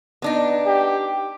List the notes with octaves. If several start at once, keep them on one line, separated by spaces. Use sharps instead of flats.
B3 D4 D#4
G4